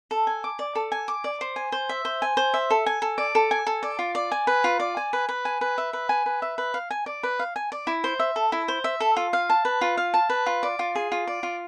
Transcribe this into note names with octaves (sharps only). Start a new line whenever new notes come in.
A4
G#5
D6
D5
A4
G#5
D6
D5
C5
G#5
C5
E5
C5
G#5
C5
E5
A4
G#5
A4
D5
A4
G#5
A4
D5
F4
D5
G#5
B4
F4
D5
G#5
B4
B4
G#5
B4
E5
B4
G#5
B4
E5
B4
F5
G#5
D5
B4
F5
G#5
D5
E4
C5
E5
A4
E4
C5
E5
A4
F4
F5
A5
B4
F4
F5
A5
B4
F4
D5
F4
G#4
F4
D5
F4